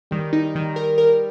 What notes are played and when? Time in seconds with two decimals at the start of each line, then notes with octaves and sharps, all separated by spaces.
0.11 D#3 G3
0.33 D#4
0.55 D#3
0.76 A#4
0.98 A#4